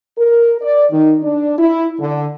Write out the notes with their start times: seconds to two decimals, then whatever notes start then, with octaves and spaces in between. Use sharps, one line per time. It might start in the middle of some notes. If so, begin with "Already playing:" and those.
0.19 A#4
0.61 D5
0.92 D#3
1.23 D4
1.59 E4
2.00 D3